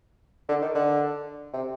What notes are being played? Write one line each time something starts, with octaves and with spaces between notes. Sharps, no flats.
D3
D#3
D3
C3